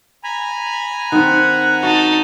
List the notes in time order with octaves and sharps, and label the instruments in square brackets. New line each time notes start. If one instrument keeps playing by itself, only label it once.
[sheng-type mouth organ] G#5 A#5 B5
[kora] D#3 C4 [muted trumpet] F#5
[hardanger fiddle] D#4 A5 [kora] F#4